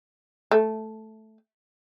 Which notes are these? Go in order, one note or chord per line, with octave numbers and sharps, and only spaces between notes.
A3